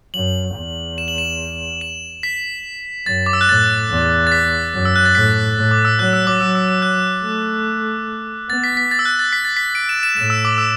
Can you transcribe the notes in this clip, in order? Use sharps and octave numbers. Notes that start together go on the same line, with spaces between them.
F#2 F#7
E2
E7
F#7
E7
E7
B6
F#2 A6
D6
E6
F#6
A2 A6
E2
A6
B6
F#2
E6
F#6
A6
A2 B6
A2
D6
E6
F#3 F#6
E6
D6
F#3 E6
E6
E6
F#6
A3
B3 A6
B6
B6
A6
E6
F#6
A6
B6
A6
B6
D7
E7
E7
A2 E7
E6
D6
E6